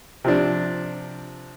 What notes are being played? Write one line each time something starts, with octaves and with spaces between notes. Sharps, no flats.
C3 F3 D4